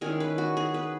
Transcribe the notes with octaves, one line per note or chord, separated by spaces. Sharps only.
D#3 G#3 C#4 E4 G#4
B4
F#4
G#4
B4